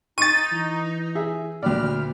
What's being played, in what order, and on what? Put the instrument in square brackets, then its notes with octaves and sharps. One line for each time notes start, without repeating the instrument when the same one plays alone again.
[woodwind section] D#4 [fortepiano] C#6 [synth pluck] A6 D#7
[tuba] E3
[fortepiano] G#4 E5
[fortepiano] D2 D5 [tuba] A#2 [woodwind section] G5 B5 F6